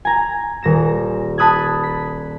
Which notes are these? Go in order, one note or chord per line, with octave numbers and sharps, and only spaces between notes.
G#5 A#5
D#1 A#6 E7
A5 B5 D#6 F#6 G#6
B6